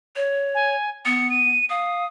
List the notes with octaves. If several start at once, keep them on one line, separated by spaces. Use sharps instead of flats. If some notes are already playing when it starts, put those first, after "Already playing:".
C#5
G#5
B3 C#7
D#7
F5 D#6